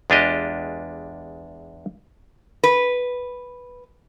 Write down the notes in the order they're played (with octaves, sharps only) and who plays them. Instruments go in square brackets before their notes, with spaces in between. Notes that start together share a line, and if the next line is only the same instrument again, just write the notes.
[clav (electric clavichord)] E2 G#3 D4 F4 G4 D#5
[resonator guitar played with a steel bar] B4